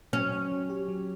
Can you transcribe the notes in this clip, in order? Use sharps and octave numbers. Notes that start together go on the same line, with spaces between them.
F#3 C#4
C#5
F#3
G4
F#3